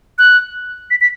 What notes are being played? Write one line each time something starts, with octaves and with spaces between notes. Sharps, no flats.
F#6
B6
B6